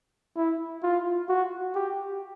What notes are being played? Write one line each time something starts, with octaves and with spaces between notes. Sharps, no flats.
E4
F4
F#4
G4